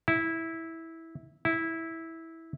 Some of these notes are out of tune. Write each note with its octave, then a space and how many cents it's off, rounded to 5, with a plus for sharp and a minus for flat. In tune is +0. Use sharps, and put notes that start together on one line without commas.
E4 -10
E4 -10